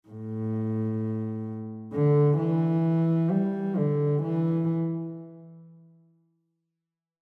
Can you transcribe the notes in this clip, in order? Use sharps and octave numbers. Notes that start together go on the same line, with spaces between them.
A2
D3
E3
G3
D3
E3